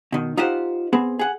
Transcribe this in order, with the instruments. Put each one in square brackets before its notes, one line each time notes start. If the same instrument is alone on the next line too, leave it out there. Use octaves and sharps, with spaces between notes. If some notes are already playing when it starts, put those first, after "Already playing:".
[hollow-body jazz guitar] B2 D#3
D#4 F4 G4 C5 F#5
B3 C4 G#4
G#4 F#5